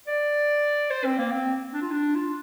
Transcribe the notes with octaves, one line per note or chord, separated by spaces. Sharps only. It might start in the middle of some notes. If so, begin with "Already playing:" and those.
D5
C5
C4
A#3
C4
D4
F4
D4
F4